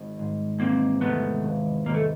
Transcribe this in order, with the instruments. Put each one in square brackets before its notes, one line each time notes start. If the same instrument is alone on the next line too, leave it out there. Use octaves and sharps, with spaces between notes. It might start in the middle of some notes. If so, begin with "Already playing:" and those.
Already playing: [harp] G#1
G#2 D#3 G#3
[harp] E1 [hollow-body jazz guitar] A#3 C4
[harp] E2 C3 D#3 G#3 [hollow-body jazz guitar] A3 B3
[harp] E1
[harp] E2 C3 D#3 G#3 [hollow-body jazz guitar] A#3
[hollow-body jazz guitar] A3